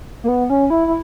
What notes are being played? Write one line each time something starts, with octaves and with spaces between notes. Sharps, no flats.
A#3
B3
C#4
E4
E4